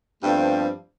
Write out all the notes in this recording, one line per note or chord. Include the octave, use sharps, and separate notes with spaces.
G2 F3 G3 A3 B3 C4